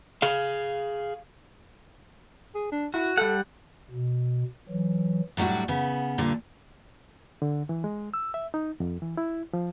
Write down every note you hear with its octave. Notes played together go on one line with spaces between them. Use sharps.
G#4 F5
G#4
D4
E4 F#4
G3 A4 F#5
B2
E3 F#3
A2 F#3 G3 D4 F#4
C#3 B3
G2 A#2 D3 D4
D3
E3
G#3
E6
E5
D#4
F2
E3
E4
F3